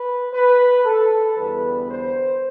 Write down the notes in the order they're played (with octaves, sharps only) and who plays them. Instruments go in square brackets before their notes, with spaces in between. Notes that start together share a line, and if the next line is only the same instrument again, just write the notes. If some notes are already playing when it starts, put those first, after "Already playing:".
Already playing: [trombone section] B4
B4
A4
E2 D3 G3 B3 B4
C5